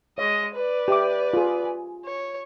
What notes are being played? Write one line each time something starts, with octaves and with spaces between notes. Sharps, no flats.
G#3 C#5 D#5
B4 D5
G4 E5 D6
F4 G#4
G#5
C#5